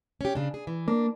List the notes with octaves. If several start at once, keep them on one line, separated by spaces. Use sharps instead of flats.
C#4 G4
C#3 D4
G#4
E3
A#3 D4